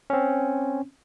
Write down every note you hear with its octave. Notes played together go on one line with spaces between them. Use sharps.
C4 C#4